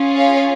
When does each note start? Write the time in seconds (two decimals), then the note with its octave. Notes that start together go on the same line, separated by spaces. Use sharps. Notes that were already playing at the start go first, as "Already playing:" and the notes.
Already playing: C#4 F4 G#4
0.14 C#5 F5